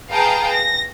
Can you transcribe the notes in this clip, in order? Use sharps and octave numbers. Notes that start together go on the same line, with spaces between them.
G#4 B4 F5 G5 A5 A#5
A#6